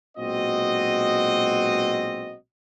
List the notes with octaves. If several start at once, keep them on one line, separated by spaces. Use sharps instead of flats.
B1 A#2 G#3 C4 F#4 D#5